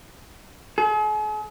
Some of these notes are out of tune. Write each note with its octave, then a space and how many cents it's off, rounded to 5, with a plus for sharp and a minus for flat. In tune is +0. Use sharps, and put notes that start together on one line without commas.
G#4 +45